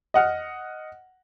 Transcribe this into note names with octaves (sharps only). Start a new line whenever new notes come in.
D#5 F#5 F6